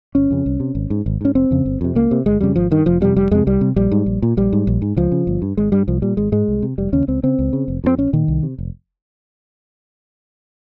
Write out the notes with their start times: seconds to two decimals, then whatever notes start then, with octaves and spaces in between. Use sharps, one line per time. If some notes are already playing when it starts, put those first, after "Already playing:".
0.15 G1 C#4
0.31 F2 C#3
0.46 C2
0.60 C3
0.75 G#1
0.90 G#2
1.06 G#1
1.21 G#2 C#4
1.35 F1 C4
1.51 F2 C#3
1.65 G1
1.81 F2 C3
1.95 C#2 A#3
2.11 C3
2.26 G1 G#3
2.41 F2 C#3 G3
2.56 G#1 F3
2.71 G2 D#3
2.86 F1 F3
3.01 F2 C3 G3
3.16 F1 G3
3.31 F2 C3 G#3
3.47 C2 G3
3.61 C3
3.76 A#1 G3
3.92 G#2
4.06 A#1
4.22 A#2
4.37 A#1 G3
4.53 G#2
4.67 A#1
4.82 G#2
4.97 C#2 F3
5.12 C#3
5.27 G1
5.42 G2
5.57 G#1 G#3
5.72 G2 G3
5.88 C2 F3
6.02 A#2 G3
6.17 G#1 G#3
6.32 G#2 G#3
6.48 C2
6.62 C3
6.78 F1 G3
6.93 D#2 C#3 C#4
7.08 C#2 C4
7.23 C#3 C4
7.39 C#2
7.53 C#3
7.68 F1
7.84 F2 C#3 C4
7.98 A#1 C#4
8.13 A#2 D#3
8.28 C2
8.43 C3
8.58 F1